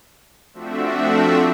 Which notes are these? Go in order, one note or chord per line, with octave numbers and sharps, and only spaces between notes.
F3 A3 C4 D4 F#4 E5